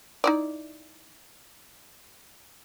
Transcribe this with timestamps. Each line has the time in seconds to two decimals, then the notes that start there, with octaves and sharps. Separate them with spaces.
0.24 D#4 E4 D5